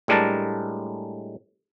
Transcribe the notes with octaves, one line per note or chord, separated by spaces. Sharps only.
A2 G3 G#3 D4 A#4 A5